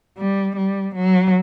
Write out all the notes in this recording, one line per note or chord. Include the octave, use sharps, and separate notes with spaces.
G3
G3
F#3